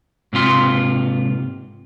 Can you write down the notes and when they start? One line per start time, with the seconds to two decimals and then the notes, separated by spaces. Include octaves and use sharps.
0.33 G#2 C3 F4 C6